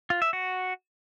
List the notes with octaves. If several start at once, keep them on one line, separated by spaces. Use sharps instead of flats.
F4
E5
F#4